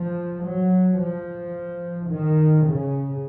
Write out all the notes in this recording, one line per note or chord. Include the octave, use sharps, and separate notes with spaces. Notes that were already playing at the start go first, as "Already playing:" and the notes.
Already playing: F3
F#3
F3
D#3
C#3